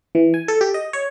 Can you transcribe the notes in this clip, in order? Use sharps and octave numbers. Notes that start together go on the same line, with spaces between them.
E3
G#5
A4
G4
D#5
C#5